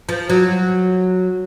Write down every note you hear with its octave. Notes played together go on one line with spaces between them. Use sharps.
F3
F#3